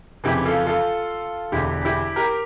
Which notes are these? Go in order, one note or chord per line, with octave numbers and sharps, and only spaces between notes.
F1 F2 C#3 E3 E4 G4
F4 A4
F4 A4
E1 E2 D3 E4 G4
E4 G4
G4 A#4